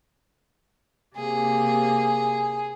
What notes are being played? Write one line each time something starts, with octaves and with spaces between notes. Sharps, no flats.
C3 A#3 G#4